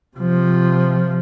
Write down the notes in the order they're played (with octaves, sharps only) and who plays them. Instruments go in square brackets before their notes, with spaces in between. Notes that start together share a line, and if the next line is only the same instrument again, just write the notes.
[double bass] C3 F3